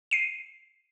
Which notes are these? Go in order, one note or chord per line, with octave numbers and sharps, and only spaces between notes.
C7 D#7